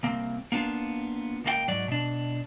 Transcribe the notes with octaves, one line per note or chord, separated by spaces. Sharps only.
C2 A#3 C4
A#3 B3 D4 F4
C#2 A#3 F4 G5
G#2 F#3 D5
B2 D4